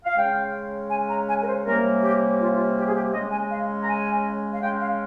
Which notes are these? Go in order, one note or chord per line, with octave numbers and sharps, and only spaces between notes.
F5
C#3 G#3 C#4 G5
G#5
A#5
G#5
A#4
C5
C3 G3 A#3 C#4 A#4
G4
F4
F4
G4
G#4
G4
C#3 G#3 C#4 D#5
G#5
F5
A#5
G#5
F5
C#3 G#3 C#4 G5
F5